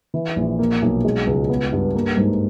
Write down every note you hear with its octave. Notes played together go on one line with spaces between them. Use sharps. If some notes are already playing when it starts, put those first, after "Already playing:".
E3
A#1
A#3
B1
G#3
C#2
B3
G2
A#3
G#2